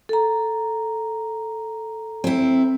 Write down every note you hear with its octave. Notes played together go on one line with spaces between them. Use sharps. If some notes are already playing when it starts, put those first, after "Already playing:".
A4 A#5
C4 E4